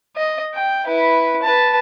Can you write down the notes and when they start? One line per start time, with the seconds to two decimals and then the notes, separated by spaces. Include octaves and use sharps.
0.17 D#5
0.54 G5
0.86 E4 B4
1.43 B4 A5